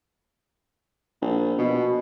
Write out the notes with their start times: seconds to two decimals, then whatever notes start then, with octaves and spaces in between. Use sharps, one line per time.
1.21 A#1
1.58 B2